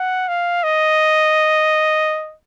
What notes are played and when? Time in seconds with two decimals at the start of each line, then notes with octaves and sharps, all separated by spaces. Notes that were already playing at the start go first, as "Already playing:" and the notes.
Already playing: F#5
0.28 F5
0.63 D#5